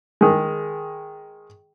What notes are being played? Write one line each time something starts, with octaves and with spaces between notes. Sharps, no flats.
D#3 G#3